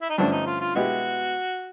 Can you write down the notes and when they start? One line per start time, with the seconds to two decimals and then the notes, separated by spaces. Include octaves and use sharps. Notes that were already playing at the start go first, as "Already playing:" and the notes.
0.02 E4
0.10 D#4
0.18 G2 D3 F3 A3 C#4 D4
0.32 D#4
0.47 F4
0.61 F4
0.75 B2 G#3 B3 E4 F#4 G4